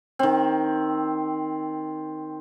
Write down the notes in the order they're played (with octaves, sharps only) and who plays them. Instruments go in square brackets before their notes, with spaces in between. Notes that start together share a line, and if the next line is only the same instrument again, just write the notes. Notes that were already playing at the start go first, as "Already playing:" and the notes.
[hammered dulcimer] D#3 C4